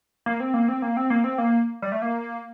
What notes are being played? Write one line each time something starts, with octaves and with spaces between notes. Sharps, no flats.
A#3
C4
A#3
C4
A#3
C4
A#3
C4
A#3
G3
A3
A#3